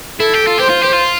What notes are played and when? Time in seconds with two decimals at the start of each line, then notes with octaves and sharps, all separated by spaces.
0.20 E4 A4
0.34 G4
0.47 F4
0.58 G4 C5
0.69 F4
0.82 G4
0.93 F4